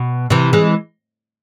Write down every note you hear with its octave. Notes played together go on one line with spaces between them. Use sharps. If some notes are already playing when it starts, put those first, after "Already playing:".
Already playing: B2
C3 E3
E3 G#3